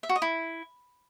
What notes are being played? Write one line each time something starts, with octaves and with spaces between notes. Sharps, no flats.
E5
F#4
D#5
E4